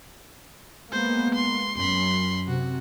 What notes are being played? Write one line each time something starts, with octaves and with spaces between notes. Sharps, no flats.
G#3 A#3 B3 C5
C6
F#2 B5 C6
C3 F#4